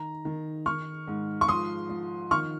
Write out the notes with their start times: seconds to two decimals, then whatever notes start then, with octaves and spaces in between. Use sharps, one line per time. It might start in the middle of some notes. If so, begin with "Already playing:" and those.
Already playing: D#3 A#5
0.25 D#3
0.66 D#3 C#6 F6
1.07 G#2
1.41 C#6
1.48 F3 C6 D#6
1.90 F3
2.31 D#3 C#6 F6